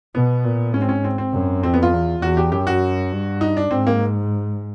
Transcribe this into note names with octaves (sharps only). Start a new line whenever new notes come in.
B2 B3
A#2
G#2 C#4
C4
C#4
C4
C4
F#2
F2 C4
B3
F4
E2
E2 F#4
G4
F#2 G4
F#4
G2
D#4
D4
G#2 C4
A#3